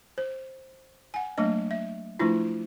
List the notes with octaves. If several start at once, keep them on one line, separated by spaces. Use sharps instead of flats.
C5
F#5 G#5
F#3 A3 A#3 D4 D#5
E5
F3 A3 D4 E4 F4